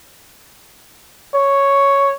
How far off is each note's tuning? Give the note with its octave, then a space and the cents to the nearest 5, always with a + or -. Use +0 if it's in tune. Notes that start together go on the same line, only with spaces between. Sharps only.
C#5 +0